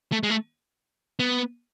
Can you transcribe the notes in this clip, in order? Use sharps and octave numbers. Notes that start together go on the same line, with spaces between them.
A3
G#3
A3
B3